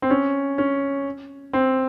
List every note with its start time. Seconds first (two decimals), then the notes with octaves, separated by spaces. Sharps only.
0.02 C4
0.10 C#4
0.58 C#4
1.53 C4